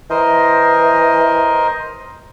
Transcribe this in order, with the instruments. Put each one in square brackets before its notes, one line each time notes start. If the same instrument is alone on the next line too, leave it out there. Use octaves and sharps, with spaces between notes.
[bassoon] E3 [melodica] A#4 C5 D#5